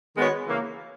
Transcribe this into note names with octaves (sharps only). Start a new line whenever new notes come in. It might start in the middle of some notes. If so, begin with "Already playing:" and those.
D#3 G#3 B3 F#4 C#5
C#3 E3 A#3